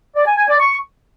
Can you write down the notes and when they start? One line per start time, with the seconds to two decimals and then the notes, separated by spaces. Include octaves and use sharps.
0.15 D5
0.26 G#5
0.37 G#5
0.49 D5
0.60 C#6